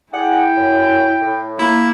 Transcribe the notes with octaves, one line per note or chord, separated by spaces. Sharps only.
E4 G#4 D5 F#5 G5
F#2
A2
A#3 E4